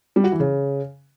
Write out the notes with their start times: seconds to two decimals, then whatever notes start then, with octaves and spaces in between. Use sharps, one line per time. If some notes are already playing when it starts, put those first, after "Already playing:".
0.16 G3
0.24 F#4
0.32 E3
0.40 C#3